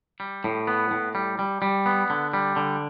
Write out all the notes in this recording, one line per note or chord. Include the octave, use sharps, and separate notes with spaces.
G3
A2
B3
A2
G3
G3
G3
B3
D3
G3
D3